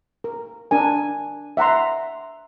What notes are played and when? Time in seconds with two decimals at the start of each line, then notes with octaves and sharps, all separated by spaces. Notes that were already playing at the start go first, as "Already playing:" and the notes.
0.24 A#4
0.71 D4 A#4 G#5
1.57 E5 F#5 A#5 C6